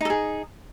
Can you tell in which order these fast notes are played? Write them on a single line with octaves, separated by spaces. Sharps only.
D#4 A4 G#4